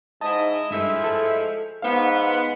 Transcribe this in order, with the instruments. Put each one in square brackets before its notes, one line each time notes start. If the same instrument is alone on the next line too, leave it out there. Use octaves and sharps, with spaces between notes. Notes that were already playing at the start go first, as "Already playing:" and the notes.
[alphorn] G#2 [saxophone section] E4 D#5 [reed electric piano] A5
[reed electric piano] G2 [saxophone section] F3 A3 E4 [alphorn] G#3
[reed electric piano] A4
[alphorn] G#2 [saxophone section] B3 [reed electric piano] F5